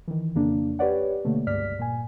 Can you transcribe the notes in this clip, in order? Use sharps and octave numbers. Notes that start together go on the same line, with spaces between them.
D#3 E3
F2 C#3 A#3 D4
G4 B4 C#5 D5 F#5
B2 D3 A3 A#3
C#2 G2 D5 F6 B6
A#2 G#5